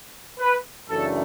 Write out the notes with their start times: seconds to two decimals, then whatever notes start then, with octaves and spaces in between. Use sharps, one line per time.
0.40 B4
0.89 F#2 C#3 E3 A3 D4 A4